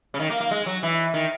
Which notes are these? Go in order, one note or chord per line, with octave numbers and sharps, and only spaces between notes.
C#3
D#3
A#3
A#3
G#3
F#3
E3
D#3